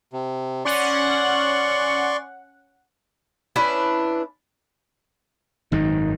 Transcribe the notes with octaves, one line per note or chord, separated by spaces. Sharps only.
C3
C#4 D5 F#5 C6 C#6
C#4 D4 E4 B4
G#1 F#2 D#3 D#4